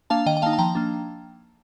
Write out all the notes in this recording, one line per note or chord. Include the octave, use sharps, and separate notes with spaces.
A#3 D4 F5 A5
D#3 D#5 G5
G5
A#3 D#4 F5 A5
A5
F3 G5 A#5
A#3 D4